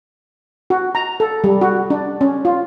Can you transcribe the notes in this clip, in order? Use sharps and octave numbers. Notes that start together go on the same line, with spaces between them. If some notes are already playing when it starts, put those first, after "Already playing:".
F#4
A#5
A4
G3
F#4
D4
C#4
F4